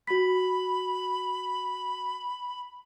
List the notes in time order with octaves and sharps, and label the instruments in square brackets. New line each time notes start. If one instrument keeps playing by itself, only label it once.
[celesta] F#4 B6 [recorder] B5